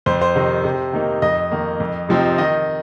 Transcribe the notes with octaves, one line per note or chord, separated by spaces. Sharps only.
F2 C5
C5
C3 D#3
C3
D#3 A#3 D#4
F2 D#5
D#3 A#3
F2
C3 F3 C4 D#4
D#3 D#5